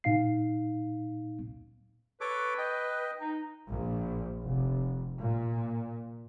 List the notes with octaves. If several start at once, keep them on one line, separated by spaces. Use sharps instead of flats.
A#2 D#4 F5 C7
A4 B4 C#5 D6
D#5 G5
D#4
A#1
F1
A#2